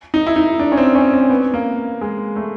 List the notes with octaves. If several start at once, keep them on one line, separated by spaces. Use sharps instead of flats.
D#4
E4
D#4
D4
C#4
C4
C#4
C4
B3
A#3
G#3
A3